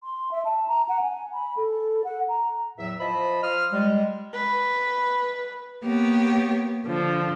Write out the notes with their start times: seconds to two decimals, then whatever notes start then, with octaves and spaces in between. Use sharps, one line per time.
0.03 C6
0.31 E5
0.45 A5
0.68 A#5
0.89 F#5
1.01 G#5
1.33 B5
1.57 A4
2.04 F#5
2.28 A#5
2.78 E2 A2 F#3 E5
3.00 F3 C5 D#5 A5 B5
3.43 F3 C6 D#6 F6
3.73 G3 G#3
4.33 B4
5.83 A#3 B3 G4 C#5
6.84 D3 F3